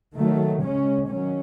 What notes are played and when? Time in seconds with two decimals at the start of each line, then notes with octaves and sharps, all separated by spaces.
0.17 D#3 F#3 A3
0.64 C#3 G#3 C#4
1.10 D#3 F#3 C#4